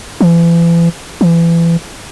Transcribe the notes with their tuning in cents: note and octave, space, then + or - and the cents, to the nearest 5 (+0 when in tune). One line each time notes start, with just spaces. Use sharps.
E3 +40
E3 +30